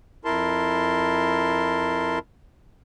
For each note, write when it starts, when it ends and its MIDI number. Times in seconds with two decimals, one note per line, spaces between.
0.25 2.19 41
0.25 2.19 64
0.25 2.19 70
0.25 2.19 81
0.25 2.19 84